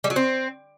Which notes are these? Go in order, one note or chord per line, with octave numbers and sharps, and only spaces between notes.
G3
F#3
C4